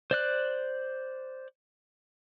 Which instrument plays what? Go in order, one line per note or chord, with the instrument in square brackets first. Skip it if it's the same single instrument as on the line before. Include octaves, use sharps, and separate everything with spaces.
[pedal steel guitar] C5 D5 F#6